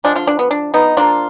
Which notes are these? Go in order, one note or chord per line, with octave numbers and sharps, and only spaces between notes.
D3 F3 G#3 D4
D4 F4
D4
B3
D4
B3 D#4
F3 A#3 D4 F4